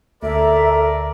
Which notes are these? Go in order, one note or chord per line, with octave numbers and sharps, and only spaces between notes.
D2 A4 A#4 D5 E5 A#5